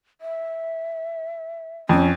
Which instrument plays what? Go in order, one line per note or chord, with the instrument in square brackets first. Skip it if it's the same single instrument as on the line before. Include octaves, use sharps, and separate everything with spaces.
[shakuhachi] E5
[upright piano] F2 [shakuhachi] C#4